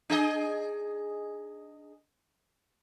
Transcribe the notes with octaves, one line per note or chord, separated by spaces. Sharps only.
D4 G#4 D#5